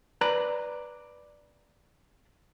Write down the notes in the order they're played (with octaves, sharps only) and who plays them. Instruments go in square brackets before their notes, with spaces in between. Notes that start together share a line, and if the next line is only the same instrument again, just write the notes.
[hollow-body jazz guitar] B4 D5 A#5